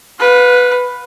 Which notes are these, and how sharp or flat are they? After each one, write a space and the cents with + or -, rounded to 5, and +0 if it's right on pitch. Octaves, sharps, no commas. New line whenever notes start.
B4 +0 F5 +45